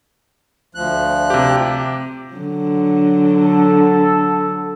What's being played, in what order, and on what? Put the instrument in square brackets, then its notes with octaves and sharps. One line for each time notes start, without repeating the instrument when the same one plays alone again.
[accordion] D2 F3 F#6
[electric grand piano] C3 G4
[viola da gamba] D3 F#3
[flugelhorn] A4